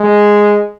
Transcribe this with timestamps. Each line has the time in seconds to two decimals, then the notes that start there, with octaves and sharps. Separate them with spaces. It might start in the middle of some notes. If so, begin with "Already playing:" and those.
Already playing: G#3